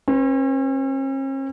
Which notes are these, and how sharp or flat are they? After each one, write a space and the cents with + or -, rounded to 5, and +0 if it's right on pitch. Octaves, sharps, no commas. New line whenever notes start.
C#4 -45 B4 +0